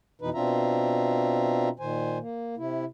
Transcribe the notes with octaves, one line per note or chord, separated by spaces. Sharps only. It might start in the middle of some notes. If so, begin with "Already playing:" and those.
F2 B2 E3 D#4 B4
B2 C4 D4 F4 E5 A#5
A#2 D#3 C5 G#5
A#3
C3 E4